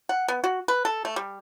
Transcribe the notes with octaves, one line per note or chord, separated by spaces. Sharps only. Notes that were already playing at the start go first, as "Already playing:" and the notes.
F#5
B3
F#4
B4
A4
A3
G3